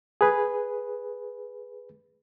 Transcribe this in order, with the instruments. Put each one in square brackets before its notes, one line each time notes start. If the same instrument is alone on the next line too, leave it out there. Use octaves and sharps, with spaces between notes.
[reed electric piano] G#4 B4